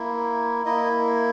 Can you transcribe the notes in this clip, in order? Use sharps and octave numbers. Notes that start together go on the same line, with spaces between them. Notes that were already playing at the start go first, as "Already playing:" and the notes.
Already playing: A#3 E4
A#3 E4 D#5